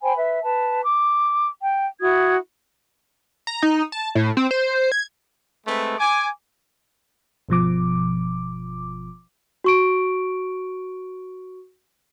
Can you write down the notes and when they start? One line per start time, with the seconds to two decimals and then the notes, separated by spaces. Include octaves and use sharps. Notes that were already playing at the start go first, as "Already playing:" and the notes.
0.02 C5 G5 G#5 B5
0.17 B4 E5
0.43 B4 A5
0.83 D6
1.64 G5
2.01 E4 F#4 D#6 G#6
3.47 A#5
3.63 D#4
3.92 A5
4.15 A2
4.37 C4
4.51 C5
4.92 G#6
5.66 G#3 A3 C4 B4
5.98 G#5 D6
7.49 G1 B2 F3 D6
9.64 F#4 C#6 D7